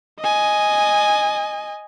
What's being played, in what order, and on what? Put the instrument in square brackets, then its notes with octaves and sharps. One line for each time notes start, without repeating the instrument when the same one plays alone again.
[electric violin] D#5 G#5